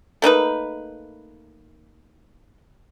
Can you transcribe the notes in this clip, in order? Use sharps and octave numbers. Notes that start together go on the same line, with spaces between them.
A3 A#3 D#4 B4